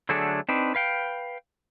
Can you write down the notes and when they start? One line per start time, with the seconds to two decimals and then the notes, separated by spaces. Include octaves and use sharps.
0.09 D3 F#3 A3 D4 G#4 A4
0.49 C4 D4 D#4 B4
0.75 B4 F5 G5